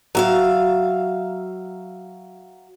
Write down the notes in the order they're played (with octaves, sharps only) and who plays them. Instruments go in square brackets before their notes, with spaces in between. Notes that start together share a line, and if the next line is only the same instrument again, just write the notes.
[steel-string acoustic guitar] F#3 E5 F5